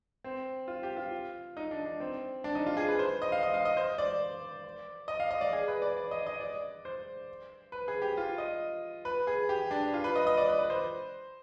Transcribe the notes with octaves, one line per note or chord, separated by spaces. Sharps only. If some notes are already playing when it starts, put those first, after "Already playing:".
C4
F4
G4
F4
D#4
D4
D4
C4
D4
D#4
F4
G#4
B4
C5
D#5
F5
D#5
F5
D#5
C5
D5
D#5
F5
D#5
D5
G#4
B4
D5
D5
D#5
D#5
D5
C5
B4
G#4
G4
F4
D#5
B4
G#4
G4
D4
F4
B4
D#5
D#5
D5
B4
B4
C5